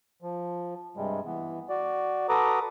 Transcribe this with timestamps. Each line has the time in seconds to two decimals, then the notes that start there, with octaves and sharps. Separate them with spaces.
0.22 F3
0.97 G2 C3 G3 G#3
1.25 E3 B3
1.69 F#4 D5
2.29 F#4 A4 B4 A#5 D6 D#6